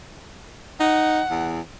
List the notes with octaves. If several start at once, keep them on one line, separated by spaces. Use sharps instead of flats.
D#4 F#5
E2